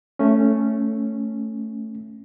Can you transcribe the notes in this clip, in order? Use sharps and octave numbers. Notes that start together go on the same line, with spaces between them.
A3 C#4